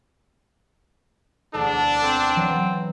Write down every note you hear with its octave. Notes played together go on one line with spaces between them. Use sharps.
E1 D2 D4 A4
C4
E3 F#3